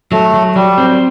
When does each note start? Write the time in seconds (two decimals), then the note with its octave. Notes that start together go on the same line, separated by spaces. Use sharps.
0.12 F#3 A3
0.34 F#3
0.55 F#3 G3
0.78 C4